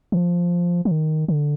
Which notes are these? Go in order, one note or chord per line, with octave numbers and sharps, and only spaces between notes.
D#3
F3
F3
D#3
D3